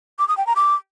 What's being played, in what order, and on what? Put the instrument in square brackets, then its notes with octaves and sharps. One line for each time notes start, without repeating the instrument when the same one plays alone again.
[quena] D6
D#6
G5
A#5
D6